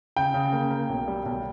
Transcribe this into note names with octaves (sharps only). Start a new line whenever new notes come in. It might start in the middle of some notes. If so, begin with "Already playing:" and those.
C#3 G5
C#3
A#3
A#3
B1
G3
B1